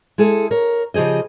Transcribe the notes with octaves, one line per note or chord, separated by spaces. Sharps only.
G#3 E4 G#4 A4
A#4 C#5
C#3 F3 G4 G#4 D#5